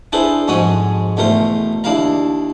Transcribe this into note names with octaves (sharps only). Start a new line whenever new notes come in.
D4 E4 G#4 A4 B4 C5
F2 G#2 G#3 F#4 C#5 D#6
E2 B2 A3 A#4 C5
D#2 D4 E4 F5 A#5